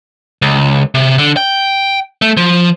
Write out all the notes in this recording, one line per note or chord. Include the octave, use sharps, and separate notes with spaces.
C#2
C3
D3
G5
A3
F3